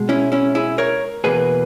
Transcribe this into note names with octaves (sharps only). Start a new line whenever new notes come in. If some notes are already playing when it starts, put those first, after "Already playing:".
Already playing: B2 G#3
C#4 E4
C#4 E4
E4 G#4
A#4 C#5
E2 B2 A#3 G#4 B4